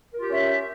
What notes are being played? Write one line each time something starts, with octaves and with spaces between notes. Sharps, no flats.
C#4 F4 G4 A#4 E5